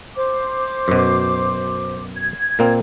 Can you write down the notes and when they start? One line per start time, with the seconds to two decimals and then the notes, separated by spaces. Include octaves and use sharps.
0.15 C5 D6
0.88 F#2 B2
2.15 G#6
2.59 A#2 A#3 C4